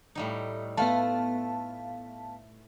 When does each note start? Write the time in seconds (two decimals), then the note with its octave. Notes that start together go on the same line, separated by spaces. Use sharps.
0.15 A2 G3 D#4
0.77 A3 B3 F4 B4 F5 A5